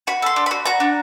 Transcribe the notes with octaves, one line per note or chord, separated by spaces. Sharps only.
F#4 B5
A4 C6
D4
F#4 B5
F#4 A#5
D4